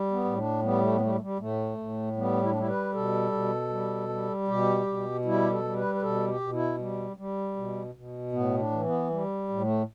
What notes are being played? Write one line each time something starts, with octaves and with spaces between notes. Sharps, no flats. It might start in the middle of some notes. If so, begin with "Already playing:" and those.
Already playing: G3
B3
A2
D4
G3 B3
A3
B3
G3 A3
A3
G3
A2 A3
A2
G3 B3
E4
D4
G3 E4
B4
B2 A4
B2
G3
G3
B2 G4
B2
G3 E4
G4
A4
G3
B4
B4
B2 A4
G4
B2
E4
G3
G3
B2
B2
A2 B3
D4
E3
B3
G3
A2
A3